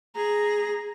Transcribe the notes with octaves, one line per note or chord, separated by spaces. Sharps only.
G#4 A#5